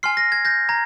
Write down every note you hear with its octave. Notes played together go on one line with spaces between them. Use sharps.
G#5 C6 F6 C7
A#6
G#6
G6 A#6
A#5 G#6